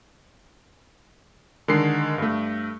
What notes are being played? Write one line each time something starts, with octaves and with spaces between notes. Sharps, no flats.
D3 D#3 G#3 C7
G2 A3